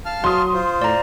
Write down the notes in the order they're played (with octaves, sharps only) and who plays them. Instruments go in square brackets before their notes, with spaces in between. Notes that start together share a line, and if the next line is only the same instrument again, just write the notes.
[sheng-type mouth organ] F5 A5 F6
[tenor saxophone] F#3 [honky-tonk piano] C6 D#6
[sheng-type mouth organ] F4 C5
[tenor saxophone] A2 [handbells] D5 A#5